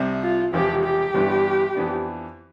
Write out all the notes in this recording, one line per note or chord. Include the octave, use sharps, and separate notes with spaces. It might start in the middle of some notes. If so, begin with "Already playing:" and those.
Already playing: C2 C3 G3 C4
F4
E1 E2 C3 F3 C4 G4
G4
G1 G2 E3 B3 D4
F2 E3 B3 D4